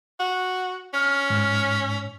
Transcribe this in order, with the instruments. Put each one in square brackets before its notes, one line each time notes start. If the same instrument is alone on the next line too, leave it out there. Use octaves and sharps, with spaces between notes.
[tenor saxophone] F#4
[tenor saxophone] C#4 [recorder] F6
[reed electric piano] G#2